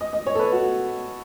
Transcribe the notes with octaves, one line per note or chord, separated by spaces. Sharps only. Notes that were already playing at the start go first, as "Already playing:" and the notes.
D#5
D#5
C#5
A4
B4
F#4